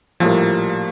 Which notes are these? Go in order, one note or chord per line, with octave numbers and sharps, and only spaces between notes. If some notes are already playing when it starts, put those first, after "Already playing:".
A#1 A2 F3 G3 A#3